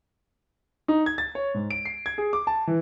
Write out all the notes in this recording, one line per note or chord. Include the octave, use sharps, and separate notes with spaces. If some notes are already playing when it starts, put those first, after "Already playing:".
D#4
G#6
A6
C#5
G#2
D7
C7
G#6
G#4
D6
A5
E3